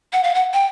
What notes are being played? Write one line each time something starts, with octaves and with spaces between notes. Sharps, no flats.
F#5
F5
F#5
G5